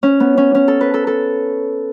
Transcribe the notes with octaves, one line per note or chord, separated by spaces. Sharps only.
C#4
B3
C#4
C#4
A4
B4
A4
A4